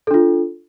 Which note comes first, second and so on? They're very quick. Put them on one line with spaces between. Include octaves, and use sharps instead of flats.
A4 D4 F4